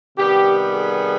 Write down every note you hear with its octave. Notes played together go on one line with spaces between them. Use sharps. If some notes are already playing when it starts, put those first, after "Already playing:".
C3 D#3 G3 B3 G4
G#4